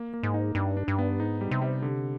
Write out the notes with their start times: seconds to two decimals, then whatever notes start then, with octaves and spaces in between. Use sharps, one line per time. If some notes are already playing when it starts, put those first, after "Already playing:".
Already playing: A#3
0.14 A#3
0.23 G#2
0.34 D#4
0.55 G2 D4
0.77 D4
0.88 G2
0.99 B3
1.19 G#2 D#4
1.41 G3
1.51 C3
1.62 G3
1.82 D3